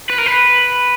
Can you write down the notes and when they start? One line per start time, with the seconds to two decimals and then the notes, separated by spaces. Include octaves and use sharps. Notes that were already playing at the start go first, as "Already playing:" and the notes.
0.09 B4
0.18 A#4
0.26 B4